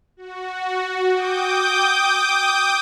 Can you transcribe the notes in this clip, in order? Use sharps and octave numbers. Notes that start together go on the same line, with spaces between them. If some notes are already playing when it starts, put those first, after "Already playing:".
F#4
G5 D6 D#6 G6